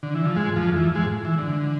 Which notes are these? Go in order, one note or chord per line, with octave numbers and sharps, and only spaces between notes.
D3
E3
F3
G#2 G#3
F2 F3
E3
G#2 G#3
E3
D3